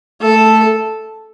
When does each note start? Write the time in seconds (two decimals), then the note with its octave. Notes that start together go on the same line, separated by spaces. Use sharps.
0.21 A3 A4